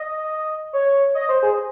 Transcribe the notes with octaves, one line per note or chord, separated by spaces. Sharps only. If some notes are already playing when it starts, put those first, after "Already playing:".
Already playing: D#5
C#5
D#5
C5
G#4